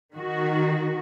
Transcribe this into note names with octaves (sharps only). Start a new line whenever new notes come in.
D#3 F#4